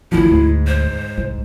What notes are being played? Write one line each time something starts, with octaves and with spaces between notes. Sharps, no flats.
G#1 D2 F3 E4
D2 G#2
C5
C2